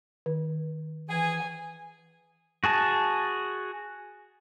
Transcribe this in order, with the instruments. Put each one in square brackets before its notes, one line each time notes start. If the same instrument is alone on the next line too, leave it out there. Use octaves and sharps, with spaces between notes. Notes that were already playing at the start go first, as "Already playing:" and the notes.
[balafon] D#3
[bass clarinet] E3 [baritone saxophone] G#4 [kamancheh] G#5
[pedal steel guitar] F#4 G#4 A5